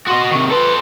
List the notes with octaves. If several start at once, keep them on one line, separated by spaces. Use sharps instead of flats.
F#4 D#5 C6
C3 D#3 C#6
A4 B4 C5